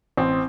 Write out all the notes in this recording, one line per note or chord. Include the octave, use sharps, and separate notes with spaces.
A1 C4